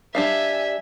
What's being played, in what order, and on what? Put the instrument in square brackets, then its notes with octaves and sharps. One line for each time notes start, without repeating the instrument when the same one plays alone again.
[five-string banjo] G3 D4 F5 [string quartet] E5 G#5